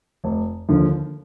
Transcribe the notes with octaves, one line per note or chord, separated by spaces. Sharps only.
F1
D#2 D3 F3